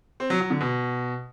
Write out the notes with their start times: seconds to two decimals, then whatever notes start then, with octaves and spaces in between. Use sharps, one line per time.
0.20 C4
0.30 F#3
0.40 F#3
0.50 D3
0.61 B2